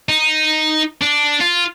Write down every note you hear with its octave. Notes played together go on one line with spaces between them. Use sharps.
D#4
D4
F4